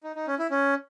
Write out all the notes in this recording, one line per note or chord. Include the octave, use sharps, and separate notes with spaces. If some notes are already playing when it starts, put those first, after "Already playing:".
D#4
D#4
C#4
E4
C#4